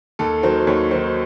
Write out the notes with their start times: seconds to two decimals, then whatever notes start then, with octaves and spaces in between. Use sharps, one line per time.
0.19 D#2 A4
0.43 D#3 F#3 C5
0.67 D#2 C#5
0.91 D#3 F#3 C5